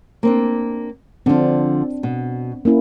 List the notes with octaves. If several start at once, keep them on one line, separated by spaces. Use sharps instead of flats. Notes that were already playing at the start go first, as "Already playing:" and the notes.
A#3 C4 D4
D3 F3 C4 D4
B2
A#3 C#4 E4